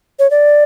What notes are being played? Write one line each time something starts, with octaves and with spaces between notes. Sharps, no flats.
C#5
D5